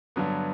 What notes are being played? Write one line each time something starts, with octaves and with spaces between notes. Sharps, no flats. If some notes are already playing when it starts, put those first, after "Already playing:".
G2 D3 F#3 B3